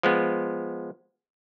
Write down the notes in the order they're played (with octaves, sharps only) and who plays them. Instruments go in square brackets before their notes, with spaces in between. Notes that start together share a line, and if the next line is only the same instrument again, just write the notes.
[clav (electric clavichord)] F3 G#3 B3